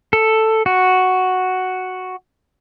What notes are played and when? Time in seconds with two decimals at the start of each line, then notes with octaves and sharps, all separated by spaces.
0.13 A4
0.66 F#4